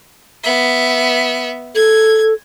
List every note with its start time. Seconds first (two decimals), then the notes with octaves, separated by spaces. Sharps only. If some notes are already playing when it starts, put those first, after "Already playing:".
0.43 B3 E5
1.75 A4 G#6